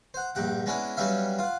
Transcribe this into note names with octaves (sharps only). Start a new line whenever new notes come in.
C5 F#5
A#1 G2 G4 F#5
G#3 B3 C#4 D4 E4
F#3 G3 B3 C#4 E5 F5
F4 F#5